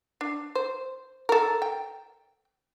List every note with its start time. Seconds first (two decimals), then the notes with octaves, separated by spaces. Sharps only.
0.21 D4
0.55 C5
1.29 A4 A#4
1.62 G5